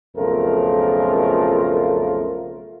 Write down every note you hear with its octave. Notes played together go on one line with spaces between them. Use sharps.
B1 F2 C#3 A3 F4 A#4